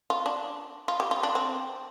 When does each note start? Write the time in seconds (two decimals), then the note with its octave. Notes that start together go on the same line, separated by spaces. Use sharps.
0.10 F4
0.26 D4
0.88 F4
1.00 G4
1.11 F4
1.23 D4
1.35 C4